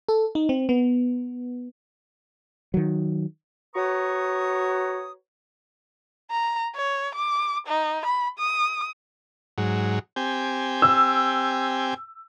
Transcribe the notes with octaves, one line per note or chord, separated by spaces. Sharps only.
A4
D#4
C4
B3
D#3 F#3
F#4 B4 C#5 A#5 C#6 D#6
A#5
C#5
D6
D#4
B5
D#6
G#2 F#3
C4 G4 G#5
E6